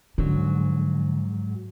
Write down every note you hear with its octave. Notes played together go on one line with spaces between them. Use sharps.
G#2 D3 F3 F#3